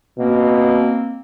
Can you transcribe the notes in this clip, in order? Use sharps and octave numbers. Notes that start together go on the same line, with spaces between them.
B2 A#3 C4